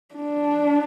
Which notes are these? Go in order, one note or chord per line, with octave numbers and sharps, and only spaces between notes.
D4